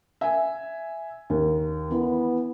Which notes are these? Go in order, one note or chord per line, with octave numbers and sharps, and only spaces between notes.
E5 G#5
D#2
E3 B3